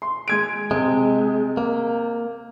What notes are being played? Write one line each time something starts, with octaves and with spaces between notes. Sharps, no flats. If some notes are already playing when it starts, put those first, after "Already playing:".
C6
G#3 G#6 D7
C3 G#3
A#3